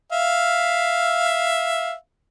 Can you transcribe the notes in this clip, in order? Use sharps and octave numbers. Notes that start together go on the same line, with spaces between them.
E5 F5